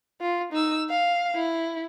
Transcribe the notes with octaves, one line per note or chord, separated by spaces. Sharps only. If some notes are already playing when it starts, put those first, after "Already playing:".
F4
D#4 E6
F5
E4